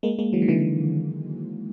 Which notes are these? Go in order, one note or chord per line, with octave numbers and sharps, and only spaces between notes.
G#3 A#3
G#3 A#3
E3 F#3
D#3
D3 E3